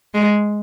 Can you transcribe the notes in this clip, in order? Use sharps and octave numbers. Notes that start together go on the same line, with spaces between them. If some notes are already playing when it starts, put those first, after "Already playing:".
G#3